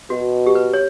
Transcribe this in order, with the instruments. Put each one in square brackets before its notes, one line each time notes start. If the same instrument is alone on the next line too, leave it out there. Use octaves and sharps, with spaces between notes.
[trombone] B2 [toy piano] F#4
[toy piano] G4
B4
C#5